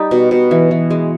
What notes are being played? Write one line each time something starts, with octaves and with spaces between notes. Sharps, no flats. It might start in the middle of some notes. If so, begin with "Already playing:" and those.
Already playing: G3 D#4 G4
B2
B2
E3
E3
G#3